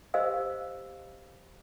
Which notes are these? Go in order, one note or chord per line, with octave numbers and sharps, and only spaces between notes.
G4 A#4 C5 D#5 F5 E6